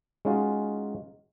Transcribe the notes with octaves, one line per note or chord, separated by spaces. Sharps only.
G#3 C#4 D#4 F4 F#4